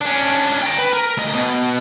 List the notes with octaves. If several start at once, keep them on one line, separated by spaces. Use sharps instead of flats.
C#4 D4
G5 A#5
B4
A#4
D2 D#5
B2